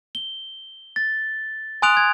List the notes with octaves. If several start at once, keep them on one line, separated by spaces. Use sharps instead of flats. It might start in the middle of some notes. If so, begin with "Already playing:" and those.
G7
A6
G#5 C6 D#6 F#6 D7 F7
G#6